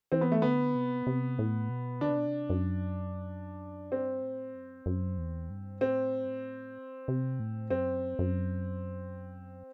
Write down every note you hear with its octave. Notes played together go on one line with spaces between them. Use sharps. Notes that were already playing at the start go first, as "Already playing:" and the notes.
E3 C4
B3
A3
D3 B3
C3
C3
A2
B2
D3 D4
C3
B2
C3
F#2
G2 C4
A2
F#2
F#2
E2
G2
A2 C4
G2
A2
C3
A2
F#2 C4
F#2